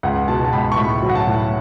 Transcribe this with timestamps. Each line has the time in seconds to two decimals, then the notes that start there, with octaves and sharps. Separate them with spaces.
0.03 C#2 F#5
0.28 B2 A5
0.45 A5
0.53 C#2 B5
0.72 C#6
0.77 A2 B5
1.03 F#3
1.10 F#5
1.15 A5
1.27 A2